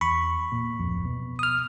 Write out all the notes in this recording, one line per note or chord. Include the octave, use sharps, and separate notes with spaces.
E2 B5 C#6
A#2
D1 F2
B2
D#6 F6